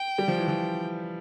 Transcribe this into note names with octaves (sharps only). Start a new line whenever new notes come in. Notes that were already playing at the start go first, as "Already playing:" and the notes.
Already playing: G5
G3
F3
E3
F3